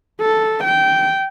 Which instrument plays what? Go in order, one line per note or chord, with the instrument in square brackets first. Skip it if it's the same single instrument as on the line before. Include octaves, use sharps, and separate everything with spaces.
[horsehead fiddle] A4
G5